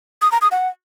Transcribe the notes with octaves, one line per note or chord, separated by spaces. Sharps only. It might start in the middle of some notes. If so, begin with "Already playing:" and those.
D#6
A#5
D#6
F#5